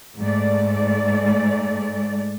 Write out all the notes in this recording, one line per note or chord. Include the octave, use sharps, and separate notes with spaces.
G#2 A3 D5